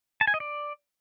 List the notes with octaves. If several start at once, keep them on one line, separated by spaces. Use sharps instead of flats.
A5
G#5
D#5
D5